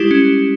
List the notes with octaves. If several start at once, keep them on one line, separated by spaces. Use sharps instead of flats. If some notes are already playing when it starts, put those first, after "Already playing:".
Already playing: G3 G#3 E4 G4
C#4